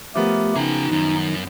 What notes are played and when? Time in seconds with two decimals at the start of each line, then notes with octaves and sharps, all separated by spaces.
0.15 F3 A3 B3 G4 A#4
0.56 C#3 D#4 F#4 G#4
0.92 F#2 D#3